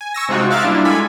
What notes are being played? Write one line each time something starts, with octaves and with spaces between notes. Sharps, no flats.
G#5
C#6 E6 A#6
C3 G#3 C4 D#4 F4 F#4
E5 F5 F#6 A6 D7
G3 A#3 D4 E4 F4
G#3 A4 G#5 B5